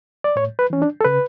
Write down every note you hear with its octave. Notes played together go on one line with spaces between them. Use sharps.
D5
A2 C#5
B4
E3 C#4
D4
A4
C#3 B4